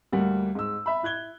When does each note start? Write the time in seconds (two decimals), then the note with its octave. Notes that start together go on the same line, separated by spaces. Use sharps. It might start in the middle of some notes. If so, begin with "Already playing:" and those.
0.12 D2 G3 A#3 F#5
0.55 G#2 E6
0.86 E5 B5
1.03 E4 F#6 G#6 G7